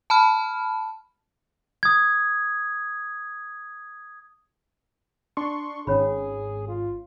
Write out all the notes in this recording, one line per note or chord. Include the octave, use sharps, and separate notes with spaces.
A5 B5 F6
D#6 G#6
D4 C6 C#6
G#1 C#4 G#4 C#5 B5
F4